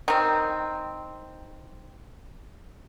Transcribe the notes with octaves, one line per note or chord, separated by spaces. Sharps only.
D#3 C4